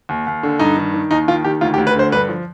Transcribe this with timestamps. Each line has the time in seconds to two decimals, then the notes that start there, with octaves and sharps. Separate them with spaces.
0.09 D#2
0.27 D#2
0.43 D3
0.59 G2 D#4
0.77 D#3
0.94 D#3
1.11 D#2 D#4
1.28 D#3 F4
1.44 D#3 G4
1.61 D2 F4
1.74 G4
1.78 D2
1.87 B4
1.96 D3 C5
2.12 G2 B4
2.29 F3